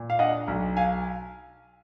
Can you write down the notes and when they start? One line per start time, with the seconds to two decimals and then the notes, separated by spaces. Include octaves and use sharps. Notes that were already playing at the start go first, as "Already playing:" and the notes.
Already playing: A#2
0.10 F5
0.19 D4 D#5 F#5
0.47 B1
0.77 F5 G#5